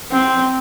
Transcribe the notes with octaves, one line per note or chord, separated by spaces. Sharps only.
C4